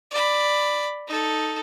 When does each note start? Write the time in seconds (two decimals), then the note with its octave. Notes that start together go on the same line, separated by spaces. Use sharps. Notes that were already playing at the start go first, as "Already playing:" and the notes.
0.11 D5 B5
1.08 D#4 A4